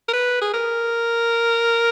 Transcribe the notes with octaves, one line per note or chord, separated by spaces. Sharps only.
A#4
B4
G#4
A#4